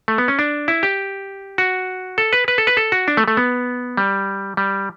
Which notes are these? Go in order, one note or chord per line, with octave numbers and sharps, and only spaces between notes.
A3
B3
C#4
D4
E4
G4
F#4
A4
B4
B4
A4
B4
A4
F#4
D4
A3
A3
B3
G3
G3